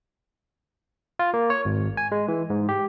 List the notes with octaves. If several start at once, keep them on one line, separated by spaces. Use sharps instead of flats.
F4
A#3
C#5
G#1
G#5
G#3
E3
G#2
G4